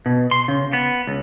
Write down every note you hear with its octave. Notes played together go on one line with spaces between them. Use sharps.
B2
C6
C#3
B3
C#2